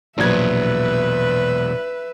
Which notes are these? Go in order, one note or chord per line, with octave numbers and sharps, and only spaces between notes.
A#1 E2 B2 F#3 B4 E5 G#6